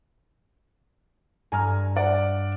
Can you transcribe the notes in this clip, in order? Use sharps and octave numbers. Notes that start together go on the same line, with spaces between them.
G2 G#5 A#5 F6
D5 F#5